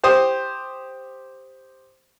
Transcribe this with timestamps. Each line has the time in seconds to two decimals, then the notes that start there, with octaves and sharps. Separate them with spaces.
0.04 G4 C5 D#6